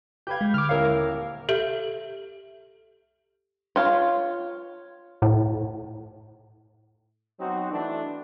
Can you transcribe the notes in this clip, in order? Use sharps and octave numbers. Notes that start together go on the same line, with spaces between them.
G4 B4 F5 G6 G#6
G#3
D3 D6 F6
D#1 E4 A#4 C#5 F5 E6
G4 A4 E5
F4 C#5
A2
F#3 B3 C4 D#4 F#4
E3 A3 D4